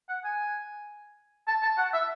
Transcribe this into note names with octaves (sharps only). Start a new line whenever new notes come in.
F#5
G#5
A5
A5
F#5
E5